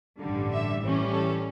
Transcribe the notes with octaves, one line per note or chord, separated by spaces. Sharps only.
A1 G2 D3 G3
E5
A2 E3 G3 C#4
A4